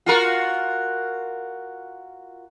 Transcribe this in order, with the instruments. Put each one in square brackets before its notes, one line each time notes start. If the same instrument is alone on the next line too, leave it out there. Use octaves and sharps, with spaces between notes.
[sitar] F4 F#4 A#4